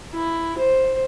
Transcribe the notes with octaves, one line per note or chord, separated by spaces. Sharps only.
E4
C5